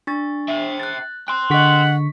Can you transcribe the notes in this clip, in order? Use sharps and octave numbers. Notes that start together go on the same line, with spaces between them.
D4 C#6 A6
E5 G5
F#6 A6
G5 C6 F#6
D3 G#4 D#5 F#5 C#6 B6